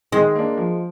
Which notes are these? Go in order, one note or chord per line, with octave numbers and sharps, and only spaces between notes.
D#3 G#3
A#3 D4
F3